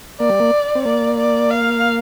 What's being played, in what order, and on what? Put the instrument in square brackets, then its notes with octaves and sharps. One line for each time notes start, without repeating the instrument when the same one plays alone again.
[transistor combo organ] A#3 [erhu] D5
[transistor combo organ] G3
A#3
C4
[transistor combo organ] A#3 [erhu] D5
[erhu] D5
F5